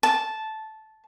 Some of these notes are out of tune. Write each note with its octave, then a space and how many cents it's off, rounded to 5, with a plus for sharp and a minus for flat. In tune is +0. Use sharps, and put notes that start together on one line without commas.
A5 -10